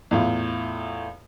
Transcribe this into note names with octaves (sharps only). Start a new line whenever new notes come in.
E2 A2 F4